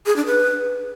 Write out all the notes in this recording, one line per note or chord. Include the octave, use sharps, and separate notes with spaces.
G#4
D4
B4